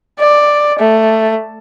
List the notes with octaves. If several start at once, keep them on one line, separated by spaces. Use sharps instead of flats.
D5
A3